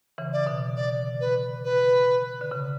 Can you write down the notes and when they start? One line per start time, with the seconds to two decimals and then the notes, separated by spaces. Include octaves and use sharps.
0.18 C#3 E3
0.33 D5
0.47 B2 D3
0.76 D5
1.21 B4
1.64 B4
2.41 D3
2.51 C#3